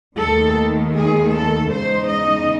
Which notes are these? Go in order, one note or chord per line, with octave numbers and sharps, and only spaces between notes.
D#2 D#3 A3 A4
G#4
A4
E2 C#3 G#3 D#4 C5
D#5